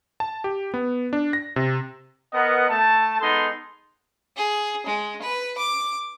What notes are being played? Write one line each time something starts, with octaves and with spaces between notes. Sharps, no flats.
A5
G4
B3
D4
A#6
C3
B3 A#4 B4 D#5 F#5
A3 A5
G#3 B3 D#4 A4 C6
G#4
G#3
B4
D6